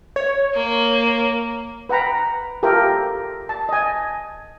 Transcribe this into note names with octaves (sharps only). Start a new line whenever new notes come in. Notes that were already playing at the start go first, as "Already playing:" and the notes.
C#5
A#3
B4 F#5 G5 A#5 B5
F4 G4 A4 A#4 E5 G5
A5
D#5 G#5